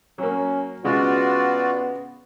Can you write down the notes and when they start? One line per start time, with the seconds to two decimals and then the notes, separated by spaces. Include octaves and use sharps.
0.18 F#3 A#3 C#4
0.85 C#3 G#3 B3 F4 F#4 D5